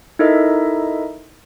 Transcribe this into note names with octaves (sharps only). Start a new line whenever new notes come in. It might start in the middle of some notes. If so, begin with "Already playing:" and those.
D#4 E4 A4 A#4 D#5 E5